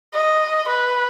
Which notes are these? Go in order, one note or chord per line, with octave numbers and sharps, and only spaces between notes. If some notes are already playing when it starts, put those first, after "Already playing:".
D#5
B4